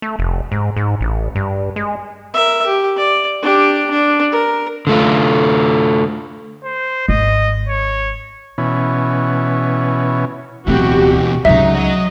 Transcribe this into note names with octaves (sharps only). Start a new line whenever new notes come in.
A3
F1
G#2
G#2
A1
G2
G#3
A#4 E5
G4
D5
D4 G4
D4
A#4
D3 A3 F4
C5
G#1 D#5
C#5
B2 E3 C#4
D1 B2 E3 C4 F#4 G4
C#2 C#3 F#3 D#4 E5
F#3 F#4 D#5